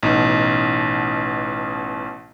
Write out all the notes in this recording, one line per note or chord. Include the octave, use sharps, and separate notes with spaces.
A1 B2 D#4